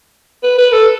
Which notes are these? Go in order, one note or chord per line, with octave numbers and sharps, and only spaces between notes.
B4
B4
A4